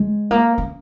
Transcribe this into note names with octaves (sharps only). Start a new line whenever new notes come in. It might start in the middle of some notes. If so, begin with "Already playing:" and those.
Already playing: G#3
A#3
C#4